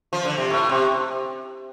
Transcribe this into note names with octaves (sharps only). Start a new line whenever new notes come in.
F3
D3
C3
A2
C3